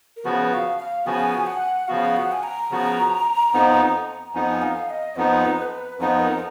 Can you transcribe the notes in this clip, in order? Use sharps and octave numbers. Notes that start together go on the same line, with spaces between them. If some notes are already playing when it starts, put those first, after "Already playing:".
A#4
C#3 F3 B3 F#4 B4
F5
F5
C#3 F3 B3 F#4 G#5
F#5
C#3 F3 B3 F#4 F5
F#5
G#5
A#5
C#3 F3 B3 F#4
F2 F3 B3 D#4
A#5
F2 F3 B3 D#4 G#5
F5
D#5
F2 F3 B3 D#4 B4
F2 F3 B3 D#4 B4
A#4